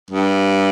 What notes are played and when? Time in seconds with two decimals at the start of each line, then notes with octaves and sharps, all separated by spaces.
0.11 G2